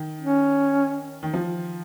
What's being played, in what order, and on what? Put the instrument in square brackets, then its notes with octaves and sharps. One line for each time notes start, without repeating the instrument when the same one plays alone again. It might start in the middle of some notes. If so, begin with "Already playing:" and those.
Already playing: [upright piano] D#3
[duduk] C#4
[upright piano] D#3
F3